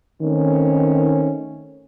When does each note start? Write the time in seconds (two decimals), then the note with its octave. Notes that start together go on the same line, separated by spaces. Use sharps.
0.22 D#3 A3 C4 C#4